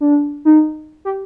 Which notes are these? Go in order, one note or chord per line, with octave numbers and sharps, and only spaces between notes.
D4
D#4
G4